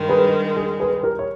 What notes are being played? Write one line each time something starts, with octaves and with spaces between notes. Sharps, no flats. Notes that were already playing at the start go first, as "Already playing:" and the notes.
Already playing: G2 D#3 G#3
G#4 B4
G#4
G#4 B4
G4 A#4
C#5